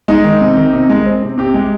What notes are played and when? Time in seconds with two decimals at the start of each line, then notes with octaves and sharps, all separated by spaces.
0.08 G#3 D#4
0.24 D#3
0.41 C3
0.57 D#3
0.73 C3
0.89 G#3
1.06 C4
1.23 C3
1.38 C3 G4
1.54 G#3